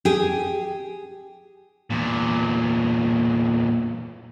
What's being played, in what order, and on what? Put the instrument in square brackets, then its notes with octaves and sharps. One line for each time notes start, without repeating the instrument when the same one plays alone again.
[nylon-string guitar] G4 G#4
[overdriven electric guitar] E2 A#2